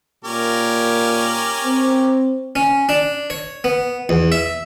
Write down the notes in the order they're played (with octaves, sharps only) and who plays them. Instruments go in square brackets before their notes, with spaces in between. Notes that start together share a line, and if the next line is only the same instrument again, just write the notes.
[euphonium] A#2 [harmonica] C#4 G4 A#4
[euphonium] C4
[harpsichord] C#4
D4
C#5
B3
E2
E5